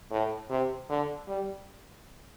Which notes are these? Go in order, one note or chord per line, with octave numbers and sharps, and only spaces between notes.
A2
C3
D3
G3